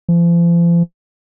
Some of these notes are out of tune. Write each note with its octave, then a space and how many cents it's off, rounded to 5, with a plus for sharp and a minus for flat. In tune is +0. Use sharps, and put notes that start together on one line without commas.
F3 -40